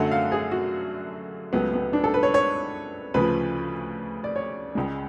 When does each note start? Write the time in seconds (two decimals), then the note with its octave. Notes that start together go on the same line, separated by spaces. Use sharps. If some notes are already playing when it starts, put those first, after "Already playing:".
Already playing: F#2 D3 F#3 A3 F#5
0.11 F5
0.32 G#4
0.52 F#4
1.53 C#2 C#3 F#3 A3 B3
1.74 B3
1.93 D4
2.04 A4
2.14 B4
2.23 C#5
2.34 C#5
3.14 D2 C#3 F3 B4
4.24 D5
4.36 C#5
4.75 C#2 C#3 G#3